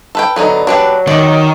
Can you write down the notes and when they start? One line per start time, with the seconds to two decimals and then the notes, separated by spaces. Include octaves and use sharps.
0.15 A4 B4 G5
0.36 D3 F#3 B3 D#4
0.67 F#3 D4 G4 B4
1.07 D#3 D5